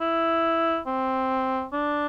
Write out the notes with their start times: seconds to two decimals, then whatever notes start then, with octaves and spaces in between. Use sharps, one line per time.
0.01 E4
0.87 C4
1.73 D4